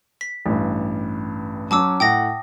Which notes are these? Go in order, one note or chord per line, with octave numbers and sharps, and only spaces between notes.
B6
A1 G2
F#3 C#4 A5 D6 E6
A2 F#5 G5 D#6 A#6